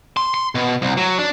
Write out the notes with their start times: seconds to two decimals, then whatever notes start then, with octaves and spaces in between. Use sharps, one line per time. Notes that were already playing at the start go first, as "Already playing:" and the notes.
0.17 C6
0.34 C6
0.55 B2
0.82 C2
0.97 F#3
1.19 D4